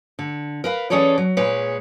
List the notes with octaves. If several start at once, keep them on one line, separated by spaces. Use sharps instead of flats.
D3
A#4 B4 F5
E3 C#4 G#4 A4 C#5 D5
F#3
A#2 G#3 G#4 B4 C#5